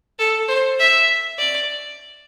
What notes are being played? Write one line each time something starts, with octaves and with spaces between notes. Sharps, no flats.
A4
C5
E5
D5